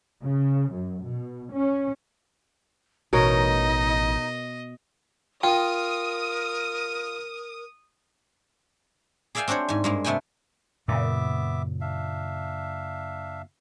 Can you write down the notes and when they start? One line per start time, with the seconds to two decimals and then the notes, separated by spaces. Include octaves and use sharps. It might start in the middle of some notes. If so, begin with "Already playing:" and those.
0.24 C#3
0.73 F#2
1.04 B2
1.53 C#4
3.13 A1 B2 D#4 A#4 C#5 D#5
5.43 F4 A#4 G5 D#6
9.35 G#4 D5 E5 F5 G5 G#5
9.48 C4 D4 F#4 C5 C#5
9.69 G#2 G#5
9.84 G2 G#3 A#3
10.04 C3 A3 B3 G5 G#5
10.88 F#2 A#2 C#3 B3 E5 D6
11.81 D4 E5 F5